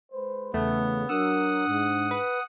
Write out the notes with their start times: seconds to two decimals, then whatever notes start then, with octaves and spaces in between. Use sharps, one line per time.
0.11 G#3 B4 C5
0.54 E2 C#3 A3 B3
1.09 F#3 D4 A#4 F#5 D#6 E6
1.68 G#2
2.11 B4